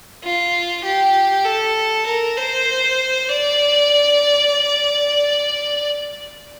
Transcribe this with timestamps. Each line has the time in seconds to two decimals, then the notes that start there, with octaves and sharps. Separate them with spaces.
0.24 F4
0.84 G4
1.45 A4
2.06 A#4
2.37 C5
3.29 D5